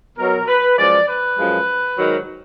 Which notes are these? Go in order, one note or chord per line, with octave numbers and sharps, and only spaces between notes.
B2 F#3 A#4
B4
F#2 F3 G#3 D5
B4
F#2 F3 G#3
G#2 D#3 F#3